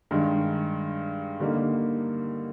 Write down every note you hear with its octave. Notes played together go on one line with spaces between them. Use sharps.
G2 D#3 G#3
D3 G3 A#3 D#4